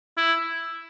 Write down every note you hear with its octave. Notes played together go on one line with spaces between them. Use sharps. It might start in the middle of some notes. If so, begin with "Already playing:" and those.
E4